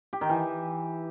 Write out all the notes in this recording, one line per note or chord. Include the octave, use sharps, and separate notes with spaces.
G4
D#3
E3